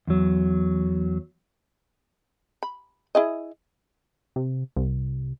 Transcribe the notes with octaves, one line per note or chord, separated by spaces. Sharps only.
E2 F#3
B5
E4 G#4 D#5
C3
C2